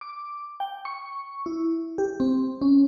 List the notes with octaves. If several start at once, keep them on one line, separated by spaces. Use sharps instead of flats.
D6
G5
C#6
E4
G4
C4
C#4